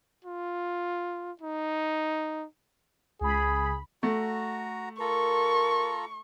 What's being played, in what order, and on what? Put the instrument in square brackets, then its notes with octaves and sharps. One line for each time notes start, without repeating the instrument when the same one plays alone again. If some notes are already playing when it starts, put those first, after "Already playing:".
[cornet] F4
D#4
[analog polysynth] C#2 B5 [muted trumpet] G#4
[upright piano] A3 [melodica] F#4 A#5
[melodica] F4 A4 A#5 [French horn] A#4 [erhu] C#6